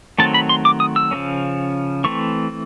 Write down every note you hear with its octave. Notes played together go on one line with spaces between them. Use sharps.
D#3 F#3 A3 C4 A5
B5
C6
D6
D#6
E6
C#3 F3 A#3 C#4
E3 A3 C4 C#6